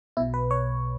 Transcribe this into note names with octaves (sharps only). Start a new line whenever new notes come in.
B1 B2 E4
B4
C#5